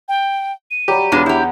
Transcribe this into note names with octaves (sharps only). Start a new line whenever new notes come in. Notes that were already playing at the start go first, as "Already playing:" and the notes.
G5
D#7
F#3 G3 G4 B5
E2 G#3 B3 D4 F4 B4
E4 G4 F#5 G5 G6